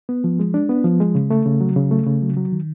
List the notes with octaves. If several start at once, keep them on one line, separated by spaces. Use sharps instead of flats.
B3
F3
G#3
D4
B3
F3
G#3
C#3
A3
C#3
F#3
C#3
A3
C#3
F#3
F#3
D#3